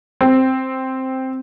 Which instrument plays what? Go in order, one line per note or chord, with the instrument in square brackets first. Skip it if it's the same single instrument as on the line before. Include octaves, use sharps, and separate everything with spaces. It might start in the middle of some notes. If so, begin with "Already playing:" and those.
[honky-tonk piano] C4